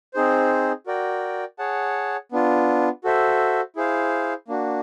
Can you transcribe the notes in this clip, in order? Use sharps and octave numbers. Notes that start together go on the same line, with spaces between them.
C4 D#4 G#4 C5
F#4 A#4 D5 G5
G#4 C#5 F#5 A5
B3 D4 F4
F#4 A4 C5 E5
E4 G#4 C5 F5
A#3 D4 F#4